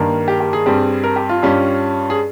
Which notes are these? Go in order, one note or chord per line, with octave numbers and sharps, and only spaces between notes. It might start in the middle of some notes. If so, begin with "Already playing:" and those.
Already playing: G2 D#3 A#3
G4
G4
G#4
G2 G3 C4
A#4
G4
F4
G2 G3 C#4
G#4